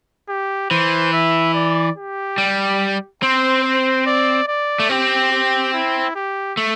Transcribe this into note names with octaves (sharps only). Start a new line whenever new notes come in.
G4
E3 C5
E5
D5
G4
G3
C4 C5
C5
D5
D5
A3
C4 G4
G4
E4
G4
A3